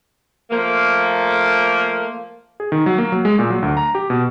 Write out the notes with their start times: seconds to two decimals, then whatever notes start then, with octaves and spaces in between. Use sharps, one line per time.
0.51 F3 A3 A#3
2.60 G#4
2.72 D#3
2.86 F#3
2.98 A#3
3.12 F#3
3.25 G#3
3.39 A#2
3.50 F#3
3.62 D2
3.77 A#5
3.95 G4
4.10 B2